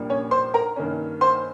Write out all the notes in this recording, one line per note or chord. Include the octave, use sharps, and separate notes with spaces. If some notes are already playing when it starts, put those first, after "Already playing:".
Already playing: A#1 A#2 G3 A#3
C#4 C#5
C5 C6
A#4 A#5
G2 D#3 A#3 C#4
C5 C6